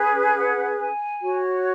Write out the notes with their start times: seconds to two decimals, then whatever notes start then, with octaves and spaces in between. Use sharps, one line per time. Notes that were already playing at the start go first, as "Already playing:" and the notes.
Already playing: C#4 G#4 B4
0.36 F#5
0.79 G#5
1.22 F#4 C#5